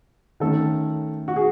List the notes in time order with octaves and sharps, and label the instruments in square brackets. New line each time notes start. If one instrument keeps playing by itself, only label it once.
[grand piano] D#3 A3 C#4 [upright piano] A4
[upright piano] F#4
G#4